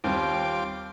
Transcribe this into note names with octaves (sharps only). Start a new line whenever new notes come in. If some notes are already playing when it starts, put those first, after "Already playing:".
D#2 G3 C4 F4 G5 D6